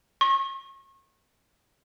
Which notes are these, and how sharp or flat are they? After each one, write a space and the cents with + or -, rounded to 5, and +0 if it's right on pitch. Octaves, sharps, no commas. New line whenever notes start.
C#6 -35